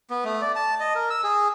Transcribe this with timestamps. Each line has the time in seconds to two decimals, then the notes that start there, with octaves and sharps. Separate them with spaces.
0.10 B3
0.25 A3
0.42 D5
0.56 A5
0.80 D#5
0.95 A#4
1.10 E6
1.24 G#4